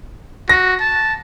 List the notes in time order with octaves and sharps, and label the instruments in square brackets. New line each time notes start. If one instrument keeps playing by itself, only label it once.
[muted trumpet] F#4 [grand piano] A#6
[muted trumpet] A5